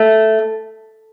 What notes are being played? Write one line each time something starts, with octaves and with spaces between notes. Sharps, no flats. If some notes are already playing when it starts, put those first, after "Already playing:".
Already playing: A3